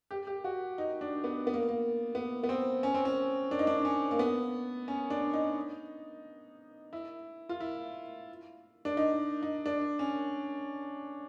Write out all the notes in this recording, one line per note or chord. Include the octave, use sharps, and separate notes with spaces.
G4
G4
F#4
D#4
D4
B3
B3
A#3
A#3
B3
B3
C4
C#4
C4
C#4
D4
D#4
D4
C#4
A#3
B3
C#4
D4
D#4
E4
F4
E4
D4
D#4
D#4
D4
C#4